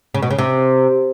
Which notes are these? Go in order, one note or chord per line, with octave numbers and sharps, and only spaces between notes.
C#3
B2
C#3
C3